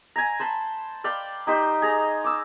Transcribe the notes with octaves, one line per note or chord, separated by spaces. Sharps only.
G#5 A#5
C5 A5 B5
D5 F5 G5 B5
D#4 G4 C5
G#4 A#5
D6 E6